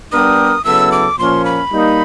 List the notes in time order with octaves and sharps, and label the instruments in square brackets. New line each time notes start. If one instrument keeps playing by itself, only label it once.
[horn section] G3 B3 D4 G4 A#4 [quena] D#6
[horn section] C#3 F#3 B3 E4 A4 [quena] E6
[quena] D6
[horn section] A#2 F3 A#3 C#4 [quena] C6
[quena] B5
[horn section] G3 A#3 D#4